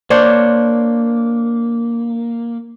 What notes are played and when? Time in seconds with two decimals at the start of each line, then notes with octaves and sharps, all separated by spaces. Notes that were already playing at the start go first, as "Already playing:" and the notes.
0.10 A#3 D4 C5 C#5